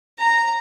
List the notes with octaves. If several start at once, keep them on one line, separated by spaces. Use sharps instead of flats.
A#5